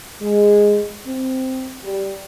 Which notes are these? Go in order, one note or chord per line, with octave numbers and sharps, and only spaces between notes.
G#3
C4
G3